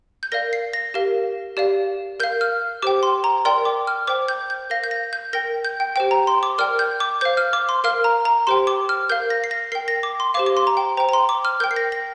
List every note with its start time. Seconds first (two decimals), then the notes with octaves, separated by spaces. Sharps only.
0.23 G6
0.32 A#4 D5 F5 A#6
0.53 C7
0.73 A#6
0.94 G4 A#4 F5
1.57 G4 D5 F5
2.20 A#4 F5 G6
2.41 F6
2.82 G4 C5 G5 D6
3.03 C6
3.24 A#5
3.45 A#4 D5 G5 C6
3.65 D6
3.87 F6
4.07 C5 G5 D6
4.28 G6
4.50 G6
4.70 A#4 F5 A#6
4.84 G6
4.91 A#6
5.13 G6
5.33 A#4 G5 A#6
5.65 G6
5.80 G5
5.96 G4 C5 G5
6.11 A#5
6.27 C6
6.43 D6
6.58 A#4 D5 G5 F6
6.79 G6
7.00 D6
7.21 C5 F5 G6
7.37 F6
7.53 D6
7.69 C6
7.84 A#4 F5 F6
8.04 A#5
8.25 A#5
8.47 G4 C5 G5 C6
8.67 D6
8.89 F6
9.10 A#4 F5 G6
9.30 A#6
9.44 C7
9.51 A#6
9.72 A#4 G5 C7
9.88 A#6
10.03 D6
10.20 C6
10.34 G4 C5 F5 D6
10.46 D6
10.57 C6
10.67 A#5
10.77 G5
10.97 C5 G5 A#5
11.09 A#5
11.13 C6
11.29 D6
11.45 F6
11.60 A#4 G5 G6
11.71 C7
11.76 A#6
11.92 A#6